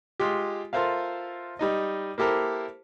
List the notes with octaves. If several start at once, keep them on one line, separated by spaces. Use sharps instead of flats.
G#3 F4 G4
F4 A4 A#4 C5 E5 F5
G3 D#4 D#5
A#3 E4 G4 A4 A#4 C5